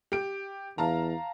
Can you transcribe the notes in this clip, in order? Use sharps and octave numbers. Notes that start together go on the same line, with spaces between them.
G4 D7
E2 F5 A5 A#5